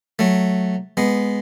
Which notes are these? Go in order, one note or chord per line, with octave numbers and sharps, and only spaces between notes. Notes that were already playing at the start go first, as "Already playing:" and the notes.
F#3 A3
G#3 B3